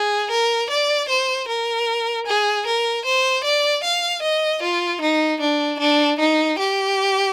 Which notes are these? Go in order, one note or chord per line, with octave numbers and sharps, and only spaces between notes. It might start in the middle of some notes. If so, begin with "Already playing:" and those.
Already playing: G#4
A#4
D5
C5
A#4
G#4
A#4
C5
D5
F5
D#5
F4
D#4
D4
D4
D#4
G4